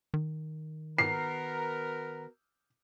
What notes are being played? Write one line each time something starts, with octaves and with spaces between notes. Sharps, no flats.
D#3
B3 F#4 A#4 C7